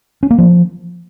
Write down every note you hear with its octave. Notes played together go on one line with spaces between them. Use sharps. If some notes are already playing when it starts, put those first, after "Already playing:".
C#4
A#3
F3